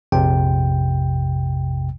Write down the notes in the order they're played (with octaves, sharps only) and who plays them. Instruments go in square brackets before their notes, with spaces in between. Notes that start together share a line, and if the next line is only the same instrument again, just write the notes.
[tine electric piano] A#1 F2 C3 G5